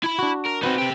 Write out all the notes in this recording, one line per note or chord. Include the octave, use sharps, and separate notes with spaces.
E4 B5
D4 F#4
A#4
C4 D#4 F#4 B4
C3 G4